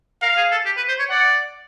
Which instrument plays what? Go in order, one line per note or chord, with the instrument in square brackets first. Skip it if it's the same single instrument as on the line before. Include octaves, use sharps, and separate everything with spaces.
[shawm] A#4 [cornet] F5
[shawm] G#4
A4
G4
B4
C5
C#5
[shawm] D5 [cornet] F#5